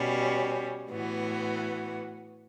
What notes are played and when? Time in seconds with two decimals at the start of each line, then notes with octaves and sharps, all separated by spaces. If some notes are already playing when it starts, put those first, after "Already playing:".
Already playing: B2 G3 C#4
0.91 A2 E3 B3 F#4